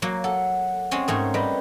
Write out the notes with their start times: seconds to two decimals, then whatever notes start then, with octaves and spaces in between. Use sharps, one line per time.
0.02 F#3 A#3
0.24 A4 F#5
0.91 G#3 C4 C#4
1.08 G#2 A3 G#4 A#4 C#5 C6
1.34 G3 B4 D#5 G6